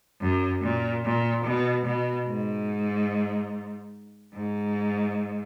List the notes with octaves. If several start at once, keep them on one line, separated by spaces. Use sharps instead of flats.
F#2
A#2
A#2
B2
B2
G#2
G#2